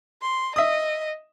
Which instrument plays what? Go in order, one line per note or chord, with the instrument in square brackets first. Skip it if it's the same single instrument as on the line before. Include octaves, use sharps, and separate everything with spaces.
[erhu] C6
[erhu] D#5 [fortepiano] E5 D#6